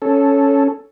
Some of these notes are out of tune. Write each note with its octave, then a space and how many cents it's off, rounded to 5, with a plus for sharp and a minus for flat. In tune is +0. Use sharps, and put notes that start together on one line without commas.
C#4 +0 A4 +0